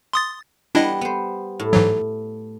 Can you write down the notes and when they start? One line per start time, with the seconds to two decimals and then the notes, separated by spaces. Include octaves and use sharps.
0.13 C6 D#6 A6
0.75 G3 B3 D4 E4 D#5
1.01 B3 C5
1.59 A2
1.73 G#2 E3 F#3